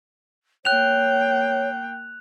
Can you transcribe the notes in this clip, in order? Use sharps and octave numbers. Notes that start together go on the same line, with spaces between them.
A#3 C#5 G5 F#6 F7